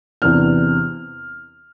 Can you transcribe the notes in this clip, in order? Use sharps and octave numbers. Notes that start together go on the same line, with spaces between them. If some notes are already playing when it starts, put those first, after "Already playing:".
E2 C3 E3 B3 D4 F6